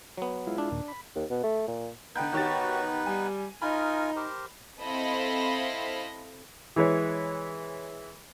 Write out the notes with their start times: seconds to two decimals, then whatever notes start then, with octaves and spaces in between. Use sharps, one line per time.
0.17 F#3 B3
0.47 G#3 E4 F4
0.58 D4
0.71 D#2 A#2
0.88 B5
1.15 D#2
1.30 B2
1.43 A3
1.68 A#2
2.16 D3 B3 D#4 B4 G5 G6
2.33 D#3 F#4 G4 C#5 A6
3.06 G3 G#5
3.62 D#4 F4 A#4 G#5 B5
4.16 G4 A#4 C5
4.81 C4 E4 A4 D#5 F5 B5
6.76 E3 G#3 B4 C#5